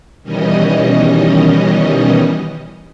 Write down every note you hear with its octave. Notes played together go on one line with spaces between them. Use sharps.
B2 D#3 E3 G3 C#4 D#5